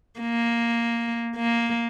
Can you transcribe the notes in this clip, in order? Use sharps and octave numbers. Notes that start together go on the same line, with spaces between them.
A#3
A#3